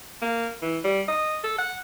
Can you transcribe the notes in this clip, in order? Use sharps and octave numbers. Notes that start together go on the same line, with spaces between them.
A#3
E3
G3
D#5
A4
F#5